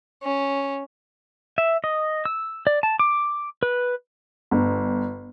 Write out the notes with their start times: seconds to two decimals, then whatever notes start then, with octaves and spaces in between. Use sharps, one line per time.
0.23 C#4
1.58 E5
1.84 D#5
2.25 E6
2.67 D5
2.83 A5
2.99 D6
3.63 B4
4.51 G1